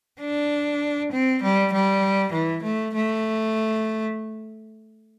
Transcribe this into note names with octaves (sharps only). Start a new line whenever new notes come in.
D4
C4
G3
G3
E3
A3
A3